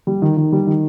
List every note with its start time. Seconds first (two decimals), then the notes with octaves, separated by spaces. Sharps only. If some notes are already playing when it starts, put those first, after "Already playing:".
0.07 G3
0.22 D#3
0.37 D#3
0.52 G3
0.67 D#3